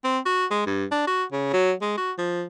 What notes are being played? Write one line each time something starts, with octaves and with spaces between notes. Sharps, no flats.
C4
F#4
G#3
G2
D4
F#4
C#3
F#3
G#3
F#4
F3